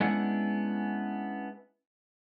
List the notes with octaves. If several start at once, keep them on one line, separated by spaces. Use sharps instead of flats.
G#3 B3 C#4 D4 E4 F#5